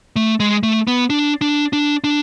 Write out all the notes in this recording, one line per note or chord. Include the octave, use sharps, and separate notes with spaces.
A3
G#3
A3
B3
D4
D4
D4
D4